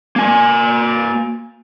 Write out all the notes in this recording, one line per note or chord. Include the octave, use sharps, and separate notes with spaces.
A#3 G#5